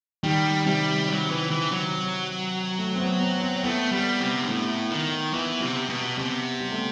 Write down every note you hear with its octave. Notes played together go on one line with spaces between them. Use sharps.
D#3 G3
C3 G3
F#3
E3
E3
F#3
A3
C4
B3
C4
C4
A3 B3
G3
C3
G2
A2
D#3
E3 B3
C3
B2
C3 B3
G3
A3